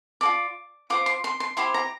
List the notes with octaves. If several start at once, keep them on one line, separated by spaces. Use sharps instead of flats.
F4 A4 D5 D6
F4 C5 D6
C6
C6
C6
E4 G4 C5 C6
A#5